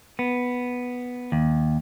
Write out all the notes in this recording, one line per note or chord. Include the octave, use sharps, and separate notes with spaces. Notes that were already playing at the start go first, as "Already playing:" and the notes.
B3
D#2